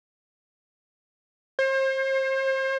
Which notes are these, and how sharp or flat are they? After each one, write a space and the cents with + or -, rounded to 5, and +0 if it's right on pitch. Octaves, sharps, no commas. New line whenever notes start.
C5 +35